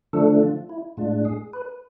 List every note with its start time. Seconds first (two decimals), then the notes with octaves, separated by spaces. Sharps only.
0.13 D3 F3 A3 D4 A4
0.41 F4
0.69 E4
0.97 A2 G#3 D4 F4
1.25 G#4
1.53 B4